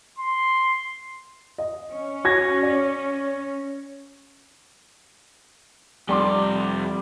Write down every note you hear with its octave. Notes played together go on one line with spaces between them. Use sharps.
C6
D#5
C#4
F#4 G#6 A#6
D5
F2 G3 G4 C6 D6